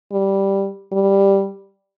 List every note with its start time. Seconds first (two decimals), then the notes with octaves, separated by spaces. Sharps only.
0.12 G3
0.93 G3